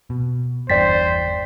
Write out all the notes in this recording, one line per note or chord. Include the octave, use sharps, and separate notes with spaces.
B2
G1 E2 G2 C5 D5 G5 A6 B6